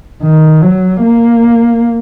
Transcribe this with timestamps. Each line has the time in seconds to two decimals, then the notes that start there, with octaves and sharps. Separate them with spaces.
0.23 D#3
0.62 F#3
1.02 A#3